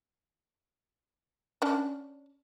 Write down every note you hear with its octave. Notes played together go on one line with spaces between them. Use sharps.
C#4 D4